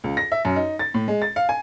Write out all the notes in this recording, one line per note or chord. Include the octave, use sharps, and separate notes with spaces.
C#2
A#6
E5
F#2
D#4
A6
A2
G#3
A6
F5
G#5